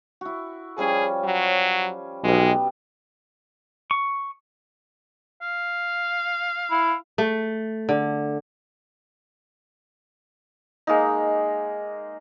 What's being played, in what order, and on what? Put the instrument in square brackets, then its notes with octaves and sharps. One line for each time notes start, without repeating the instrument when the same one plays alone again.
[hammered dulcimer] E4 F#4
[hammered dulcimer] F3 G3 C#4 [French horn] G#4
[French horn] F#3
[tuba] B1 [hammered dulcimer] B2 G4 [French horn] G#3
[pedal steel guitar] C#6
[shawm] F5
[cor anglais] E4
[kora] A3
D3
[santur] G#3 A#3 D#4